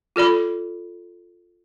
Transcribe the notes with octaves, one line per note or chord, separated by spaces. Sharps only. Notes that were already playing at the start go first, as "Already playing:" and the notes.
F4 A4 D5 B5